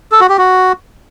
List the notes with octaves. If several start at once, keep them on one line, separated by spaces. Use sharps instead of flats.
A4
F#4
G4
F#4